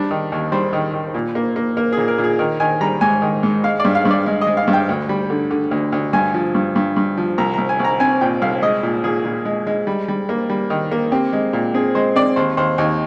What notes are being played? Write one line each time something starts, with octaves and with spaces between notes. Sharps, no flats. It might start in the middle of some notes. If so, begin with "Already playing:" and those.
Already playing: G3 D4
D#3
D#2
G3 C5
D#3
D#3
A#2
A#3
A#3
A#3 A#4
A#2 G#4
A#4
A#2
G#4
D#3 A#4
D#3 G#5
G3 A#5
G#2 G#5
D#3
G#2
G#3 F5
G2 D5
F5
G2
D5
G#3
D#5
G#3
F5
G2
G5
D2
G3
D3
D3
D2
D2
G2 G#5
F3
G2
G2
G2
F3
C2 A#5
C2 A#5
G#5
C2 A#5
C4 G#5
A#2 G5
C2 F5
G#3 D#5
A#2
A#2 G#4
A#2
G#3
G#3
G3
G3
A#3
G3
D#3
A#3
C4 G4
G#3
A#2
C4 G#4
G#3 C5
C4 D5
D#2 C5
D#2 C5
D#2 D#4